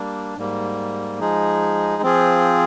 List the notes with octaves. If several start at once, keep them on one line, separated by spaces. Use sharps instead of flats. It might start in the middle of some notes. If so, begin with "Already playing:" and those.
Already playing: G3 A#3 D4
G#2 G3 A#3
F3 G#3 D#4 G#4
F3 C4 F4 G#4